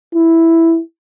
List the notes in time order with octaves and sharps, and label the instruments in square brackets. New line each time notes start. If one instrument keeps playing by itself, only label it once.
[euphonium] E4